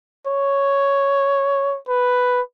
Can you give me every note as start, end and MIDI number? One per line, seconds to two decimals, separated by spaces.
0.27 1.78 73
1.88 2.41 71